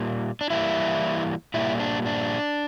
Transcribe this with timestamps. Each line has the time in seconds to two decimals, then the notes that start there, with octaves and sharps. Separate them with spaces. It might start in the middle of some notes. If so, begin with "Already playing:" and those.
Already playing: A#2 G3 A#3
0.41 D4
0.50 E3 G3 A#3 E4
1.54 A#2 G3 A#3 E4
1.80 D4
2.06 D4